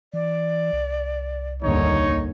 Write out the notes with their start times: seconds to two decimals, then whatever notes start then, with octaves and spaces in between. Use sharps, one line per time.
0.13 E3 D5
0.73 C2
1.63 G1 D#2 D3 D#4 C#5